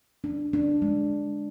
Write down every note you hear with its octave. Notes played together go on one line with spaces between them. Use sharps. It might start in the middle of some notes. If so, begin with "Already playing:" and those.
D4
D4
G#3